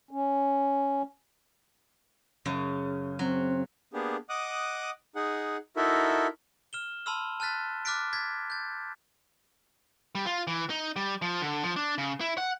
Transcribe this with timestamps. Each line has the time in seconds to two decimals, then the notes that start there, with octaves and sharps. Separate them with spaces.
0.11 C#4
2.46 F#2 C#3
3.19 F#3 C4
3.94 A#3 B3 D4 G4 G#4
4.29 D#5 F#5 D6 D#6 F#6
5.16 D#4 G#4 F#5
5.77 D#4 E4 F#4 A4 A#4 E5
6.73 F6 E7 G7
7.06 A5 B5 C6 E6 F6
7.40 A5 F6 F#6 A6 B6
7.85 D6 F6 F#6 A6 B6 D7
8.13 G#6 A6 B6
8.50 G6 A6
10.15 G3
10.26 F4
10.47 E3
10.70 D#4
10.96 G3
11.22 F3
11.41 D3
11.63 F3
11.76 D4
11.98 C#3
12.21 E4
12.38 F#5